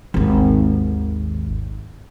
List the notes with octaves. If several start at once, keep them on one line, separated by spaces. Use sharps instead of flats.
G#1 D#2